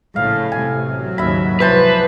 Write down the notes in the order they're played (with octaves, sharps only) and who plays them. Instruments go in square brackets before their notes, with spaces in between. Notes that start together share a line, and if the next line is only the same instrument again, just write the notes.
[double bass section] A#1 C#3 [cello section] A2 A3 [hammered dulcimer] F5
[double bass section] A1 C3 [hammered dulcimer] G#5
[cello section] F#3
[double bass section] D#2 G#2 C#3 [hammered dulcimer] E5 B5
[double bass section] C2 G#2 F3 [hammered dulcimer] E3 C5 A5 [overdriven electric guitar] B4